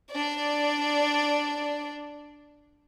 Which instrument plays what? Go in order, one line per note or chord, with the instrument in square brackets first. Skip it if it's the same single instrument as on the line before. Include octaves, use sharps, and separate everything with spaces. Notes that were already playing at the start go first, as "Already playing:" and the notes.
[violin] D4 D5